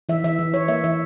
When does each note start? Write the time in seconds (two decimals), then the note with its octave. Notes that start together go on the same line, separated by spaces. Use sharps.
0.09 E3 E5
0.24 E3 E5
0.39 E3
0.54 E3 C#5
0.68 A#3 E5
0.84 E3 E5